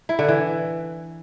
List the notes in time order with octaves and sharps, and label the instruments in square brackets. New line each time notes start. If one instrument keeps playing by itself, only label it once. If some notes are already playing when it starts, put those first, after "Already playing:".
[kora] E4
D3
E3